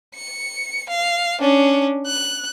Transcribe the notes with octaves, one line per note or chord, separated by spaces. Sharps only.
C#7
F5
C#4 D4
F#6